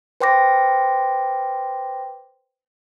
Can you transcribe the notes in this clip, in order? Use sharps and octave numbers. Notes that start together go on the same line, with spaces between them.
B4 C5 G5 C6 D6 A#6